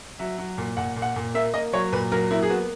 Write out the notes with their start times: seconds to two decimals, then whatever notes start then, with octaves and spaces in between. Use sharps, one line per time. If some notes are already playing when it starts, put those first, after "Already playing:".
0.19 F#3 E5
0.38 F#3
0.58 A#2
0.77 A#2 F#5
0.96 A#2
1.02 F#5
1.16 A#2
1.34 A#3 E5
1.54 A#3 D#5
1.73 F#3 C#5
1.92 A#2 B4
2.12 F#3 A#4
2.31 A#3 E4
2.43 G#4
2.50 B3 F#4